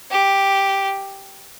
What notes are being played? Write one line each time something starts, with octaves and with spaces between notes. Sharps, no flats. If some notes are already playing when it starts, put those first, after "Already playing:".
G4